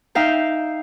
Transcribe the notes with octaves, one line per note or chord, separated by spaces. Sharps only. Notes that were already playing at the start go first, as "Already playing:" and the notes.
D#4 E5 F5 G5